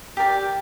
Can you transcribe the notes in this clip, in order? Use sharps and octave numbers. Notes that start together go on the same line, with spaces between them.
G4 A#4 D5